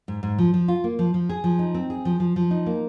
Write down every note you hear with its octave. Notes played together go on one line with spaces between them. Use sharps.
G#2
G#2
F3
F3
F4
A#3
F3
F3
G#4
F3
D#4
C4
G#4
F3
F3
F3
D#4
A#3